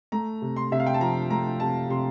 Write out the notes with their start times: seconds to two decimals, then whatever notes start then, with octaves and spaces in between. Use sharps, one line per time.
0.12 A3 A#5
0.42 C3
0.56 C6
0.71 C3 E5
0.80 F5
0.86 G5
0.94 A5
1.01 F3 A#5
1.30 A3 A#5
1.60 C3 A5
1.90 C3 C6